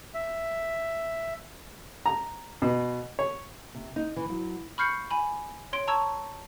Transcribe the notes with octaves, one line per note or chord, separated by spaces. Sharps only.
E5
A#5
B2
C#5
C3
D#4
E3
F#3
B5 C#6 F6 G6 C7 C#7
G#5 B5
C#5 C6 D7
A5 A#5 C#6 E6 G#6